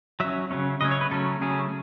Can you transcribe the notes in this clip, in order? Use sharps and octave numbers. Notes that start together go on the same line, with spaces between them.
F#3 C#4 E5
C#3 F#3 A3 C#4
C#3 F#3 A3 C#4 D#5
C#5
B4
C#3 F#3 A3 C#4 A4
C#3 F#3 A3 C#4 G#4